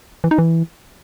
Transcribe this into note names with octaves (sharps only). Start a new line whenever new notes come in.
E3
D#4
E3